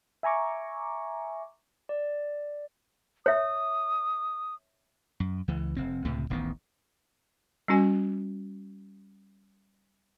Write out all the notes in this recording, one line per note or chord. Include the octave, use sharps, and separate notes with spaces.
E5 G#5 A#5 C#6 D6
D5
C#5 E5 D#6
F#2
C#2 E3
F1 C4
C#2 A2 C3
D1 A1 D#3 B3
G3 C#4 F#4 G#5